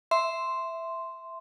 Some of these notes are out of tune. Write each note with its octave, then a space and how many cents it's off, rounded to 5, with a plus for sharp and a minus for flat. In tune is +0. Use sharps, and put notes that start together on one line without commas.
E5 +0 C6 -5